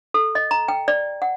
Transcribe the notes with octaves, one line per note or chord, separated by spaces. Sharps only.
A4
D#5
A#5
G5
D5
F#5